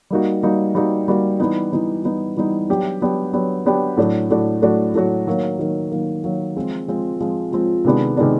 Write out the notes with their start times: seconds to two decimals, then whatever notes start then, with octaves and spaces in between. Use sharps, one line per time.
0.10 G3 A#3 D#4 F#4
0.43 G3 A#3 D#4 F#4
0.75 G3 A#3 D#4 F#4
1.08 G3 A#3 D#4 F#4
1.40 E3 G3 B3 D#4
1.72 E3 G3 B3 D#4
2.04 E3 G3 B3 D#4
2.37 E3 G3 B3 D#4
2.69 F#3 B3 D4 G4
3.01 F#3 B3 D4 G4
3.33 F#3 B3 D4 G4
3.65 F#3 B3 D4 G4
3.97 A2 F#3 A3 D4 F#4
4.30 A2 F#3 A3 D4 F#4
4.62 A2 F#3 A3 D4 F#4
4.94 A2 F#3 A3 D4 F#4
5.27 D#3 F#3 A#3
5.59 D#3 F#3 A#3
5.91 D#3 F#3 A#3
6.24 D#3 F#3 A#3
6.56 F3 G#3 C4 F4
6.88 F3 G#3 C4 F4
7.21 F3 G#3 C4 F4
7.52 F3 G#3 C4 F4
7.85 C3 D#3 G#3 B3 D4
8.17 C3 D#3 G#3 B3 D4